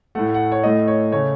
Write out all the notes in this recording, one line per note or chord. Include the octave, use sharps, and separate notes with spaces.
A2 A3 F#5
F#5
C#5
A2 A3 D#5
C#5
C#3 A3 C#5